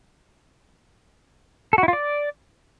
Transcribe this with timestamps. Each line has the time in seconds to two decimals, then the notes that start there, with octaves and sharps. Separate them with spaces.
1.73 A4
1.78 F#4
1.83 E4
1.88 F4
1.93 D5